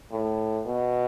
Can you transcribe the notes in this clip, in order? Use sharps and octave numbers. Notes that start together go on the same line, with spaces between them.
A2
B2